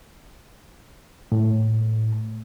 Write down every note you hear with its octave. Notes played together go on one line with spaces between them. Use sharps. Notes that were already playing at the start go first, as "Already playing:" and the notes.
A2